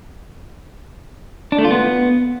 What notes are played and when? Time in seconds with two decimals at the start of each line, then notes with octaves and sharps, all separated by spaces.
1.52 D4
1.58 A3
1.65 F4
1.71 B3